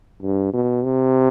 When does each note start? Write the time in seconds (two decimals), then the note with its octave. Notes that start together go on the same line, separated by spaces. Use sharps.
0.22 G2
0.53 B2
0.84 C3